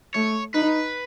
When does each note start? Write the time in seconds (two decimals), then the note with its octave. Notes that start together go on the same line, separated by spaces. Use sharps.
0.14 A3 C#5
0.54 D#4 B4